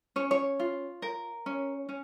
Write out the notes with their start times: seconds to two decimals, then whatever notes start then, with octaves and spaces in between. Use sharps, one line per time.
0.16 C#4 C#5
0.31 C#5
0.59 F4
1.02 A#4
1.46 C#4
1.89 C#4